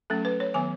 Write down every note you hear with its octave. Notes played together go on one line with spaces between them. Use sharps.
F#3 A3 C#4 A4
B4
C#5
D#3 F#3 B3 G#5